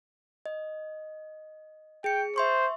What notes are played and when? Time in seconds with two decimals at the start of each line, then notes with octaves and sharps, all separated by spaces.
0.46 D#5
2.04 G#4 G5 C#7
2.36 C5 E5 C6 C#6